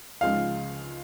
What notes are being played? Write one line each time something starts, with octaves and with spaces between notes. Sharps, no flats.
C#2 C#3 F3 G#3 D#4 F5